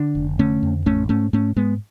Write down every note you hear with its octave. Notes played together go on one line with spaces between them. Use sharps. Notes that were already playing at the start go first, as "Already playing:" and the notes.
Already playing: D3 D4
F1
D3 A3 C#4
F2
A1 A3 C#4
G#2 A3 C#4
G#2 A3 C#4
G#2 G#3 B3